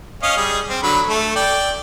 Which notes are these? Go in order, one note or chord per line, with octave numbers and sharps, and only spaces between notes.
C#4 D#5 F5
G3 G#4
C4
D3 F#3 B5
A3 A4
D5 G5